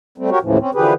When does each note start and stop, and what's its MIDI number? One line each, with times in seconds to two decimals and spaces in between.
0.18 0.30 55
0.18 0.30 57
0.18 0.30 60
0.31 0.39 66
0.31 0.39 67
0.31 0.39 70
0.31 0.39 73
0.42 0.58 39
0.42 0.58 45
0.42 0.58 49
0.42 0.58 52
0.42 0.58 53
0.59 0.71 60
0.59 0.71 61
0.75 0.94 50
0.75 0.94 52
0.75 0.94 53
0.75 0.94 67
0.75 0.94 68
0.75 0.94 71